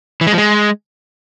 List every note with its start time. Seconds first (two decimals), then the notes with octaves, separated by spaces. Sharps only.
0.21 E3
0.27 G#3
0.32 F3
0.38 G#3